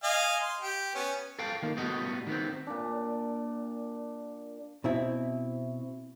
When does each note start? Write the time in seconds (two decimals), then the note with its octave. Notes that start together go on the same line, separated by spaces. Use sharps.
0.04 D#5 F5 G#5
0.41 C6
0.61 G4
0.95 B3 C#4
1.39 A4 F5 G5
1.62 D#3 A#3
1.77 A2 G3 B3 F#4 D#5
2.27 D#3 B3 C4
2.67 A#2 D4
4.84 B2 C4 E4